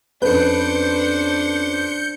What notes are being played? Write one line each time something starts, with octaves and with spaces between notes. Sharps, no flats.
F2 C#4 D4 B4 C5 G6 C#7